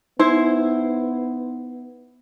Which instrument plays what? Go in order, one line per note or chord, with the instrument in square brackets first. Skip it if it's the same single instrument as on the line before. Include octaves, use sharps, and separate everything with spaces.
[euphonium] B3 [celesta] D#4 [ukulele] E4 C5